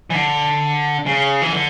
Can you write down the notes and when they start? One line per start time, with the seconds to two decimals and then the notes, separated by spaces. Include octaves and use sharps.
0.10 E3
0.14 D3
1.06 C#3
1.42 E3
1.52 D3